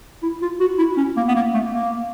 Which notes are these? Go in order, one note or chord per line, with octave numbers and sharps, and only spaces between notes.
E4
F4
F#4
E4
C#4
A#3
B3
A#3
A3
A#3